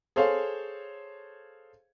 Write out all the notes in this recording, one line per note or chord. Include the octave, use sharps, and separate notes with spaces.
G#4 A4 C5 C#5 F5